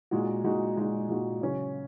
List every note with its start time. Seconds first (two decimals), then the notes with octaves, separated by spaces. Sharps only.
0.11 A#2 G#3 D#4 F#4
0.44 A#2 G#3 D#4 F#4
0.76 A#2 G#3 D#4 F#4
1.09 A#2 G#3 D#4 F#4
1.41 C#3 F#3 C#4